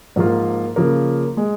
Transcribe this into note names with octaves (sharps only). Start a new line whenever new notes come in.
G#2 F3 A#3 F4
C#3 F3 A#3
G#3